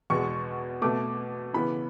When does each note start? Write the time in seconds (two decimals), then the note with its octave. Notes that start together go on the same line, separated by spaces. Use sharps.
0.10 E2 B2 G#3 C#6
0.82 B2 A3 D6
1.54 C#3 E3 B3 B5